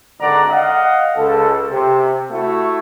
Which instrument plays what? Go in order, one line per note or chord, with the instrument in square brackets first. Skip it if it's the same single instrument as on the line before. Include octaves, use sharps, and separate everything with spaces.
[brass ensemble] G#1 D3 D5 F#5 A#5
D#5 F5 F#5
C#2 A4
C3
A3 E4 F#4